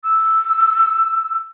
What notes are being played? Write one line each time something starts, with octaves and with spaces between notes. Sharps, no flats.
E6